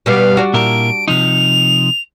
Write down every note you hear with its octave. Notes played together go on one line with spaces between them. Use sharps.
B2 G3 B3 F5
D4 F#4
A#2 E4 A#4 D7
C3 F3 D#4 F7